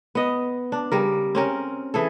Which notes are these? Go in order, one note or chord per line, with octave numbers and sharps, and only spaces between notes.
B3 D#5
D4
C#3 G3 A#4
C4 C#4 A#4
E3 G#4 A4